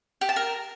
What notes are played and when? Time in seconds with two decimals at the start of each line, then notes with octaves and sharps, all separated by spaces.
0.21 G4
0.29 A5
0.36 A#4